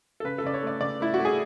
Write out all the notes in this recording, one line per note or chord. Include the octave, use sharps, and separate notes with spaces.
A4
C#3 B4
A4
C#3 D5
C#5
A3 D5
C#3 D5
A3 E4
F#4
A3
G#4